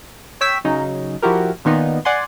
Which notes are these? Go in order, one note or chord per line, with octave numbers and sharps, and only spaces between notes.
C#5 G5 E6 B6
C#3 F#3 D#4
F3 E4 F#4 G4 A#4
A#2 D#3 B3 D#4
D5 F#5 G#5 C6